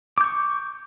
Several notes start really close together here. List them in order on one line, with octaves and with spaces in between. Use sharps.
D6 G6 C#6